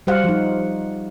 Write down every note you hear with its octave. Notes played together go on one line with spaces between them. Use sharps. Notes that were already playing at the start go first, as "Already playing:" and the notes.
G3 F#4 G4 C5 F5 F#5
F3 D#4